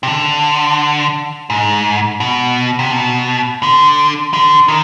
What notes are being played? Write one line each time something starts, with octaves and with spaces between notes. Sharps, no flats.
C3
D3
G#2
B2
C3
B2
D3
D3
D#3